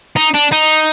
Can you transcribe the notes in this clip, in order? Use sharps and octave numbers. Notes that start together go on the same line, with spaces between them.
D#4
D4
D#4